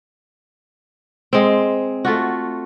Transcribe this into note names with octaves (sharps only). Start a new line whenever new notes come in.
G#3 C4
A3 F4 F#4